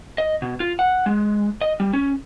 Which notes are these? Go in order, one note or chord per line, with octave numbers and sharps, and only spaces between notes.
D#5
B2
F4
F#5
G#3
D#5
G3
C#4